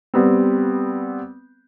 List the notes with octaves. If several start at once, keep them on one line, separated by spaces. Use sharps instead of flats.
G3 B3 C4